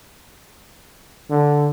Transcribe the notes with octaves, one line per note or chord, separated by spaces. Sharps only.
D3